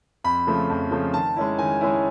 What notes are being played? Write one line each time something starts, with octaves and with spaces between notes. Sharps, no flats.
F2 B5
C#3 F3 A3
F2
C#3 F3 A3
D#3 A5
G#3 C#4 E4
D#3 G#5
G#3 C#4 E4